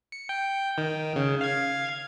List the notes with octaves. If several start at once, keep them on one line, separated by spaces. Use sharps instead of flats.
C#7
G5
D#3
C#3
F5 G#6